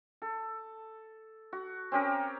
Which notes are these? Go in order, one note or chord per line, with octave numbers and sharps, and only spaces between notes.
A4
F#4
C4 C#4 G4 A#4